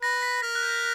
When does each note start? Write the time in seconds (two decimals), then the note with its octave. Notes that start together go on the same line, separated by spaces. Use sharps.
0.02 B4 A#6
0.22 B6
0.42 A#4 A#6
0.55 F#6
0.63 G6